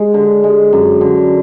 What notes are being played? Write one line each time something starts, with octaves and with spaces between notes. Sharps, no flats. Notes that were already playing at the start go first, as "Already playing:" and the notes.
Already playing: G#3
D3
G#3
F#2
D3